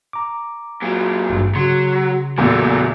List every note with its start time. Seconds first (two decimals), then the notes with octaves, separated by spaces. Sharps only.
0.13 A#5 D6
0.82 A#2 F#3
1.30 G#1 G2
1.55 C#3 F#3 C6 C#7
2.38 E2 A#2 F#3 A3